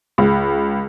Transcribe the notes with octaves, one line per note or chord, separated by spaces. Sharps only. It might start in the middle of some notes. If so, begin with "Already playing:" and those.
C#2